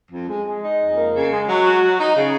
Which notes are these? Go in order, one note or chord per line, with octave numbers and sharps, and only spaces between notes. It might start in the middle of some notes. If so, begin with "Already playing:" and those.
F2
G#3
G#3
D#4
F2
A#3
C#3
G#3
F#3
F#4
F#3
D#4
C#3